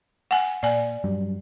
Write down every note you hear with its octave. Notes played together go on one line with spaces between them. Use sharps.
F#5 G#5
A#2 D5 G#5
G2 F#3 G3